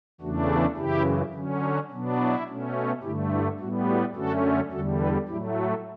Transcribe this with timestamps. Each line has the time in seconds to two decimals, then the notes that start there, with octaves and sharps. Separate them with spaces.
0.21 E2 C#3 E3 A3 D4 F#4
0.49 E4 G4
0.77 F#2 C#3 E3 E4 G4
1.33 D3 F#3 C#4
1.62 F#4
1.90 B2 F#3 B3 D4
2.18 E4
2.47 B2 A3 C#4
3.02 G2 D3 A3 E4 G4
3.32 E4
3.59 A2 G3 B3 F#4
3.88 F#4
4.15 F#2 D3 A3 C#4 F#4 A4
4.71 E2 D3 G3 F#4 A4
5.00 G4 B4
5.28 A2 F#3 A3 E4 G4
5.56 F#4 A4